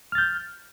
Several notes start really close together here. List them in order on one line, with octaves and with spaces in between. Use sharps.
F6 A6 G6